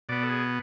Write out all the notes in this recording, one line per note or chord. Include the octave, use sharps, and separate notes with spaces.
B2 B3 D5
A4
G#4